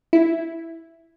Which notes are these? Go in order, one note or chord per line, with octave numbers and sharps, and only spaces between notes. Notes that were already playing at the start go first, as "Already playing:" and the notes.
E4